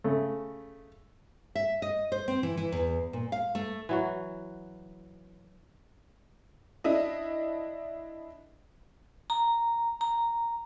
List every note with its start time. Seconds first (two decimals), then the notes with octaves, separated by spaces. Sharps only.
0.04 C#3 A3
1.55 E5
1.82 D#5
2.12 C5
2.28 C4
2.43 E3
2.57 E3
2.72 E2
3.13 A#2
3.32 F5
3.55 A3
3.89 E3 F#3 F#4
6.84 D4 E4 D#5
9.30 A#5
10.01 A#5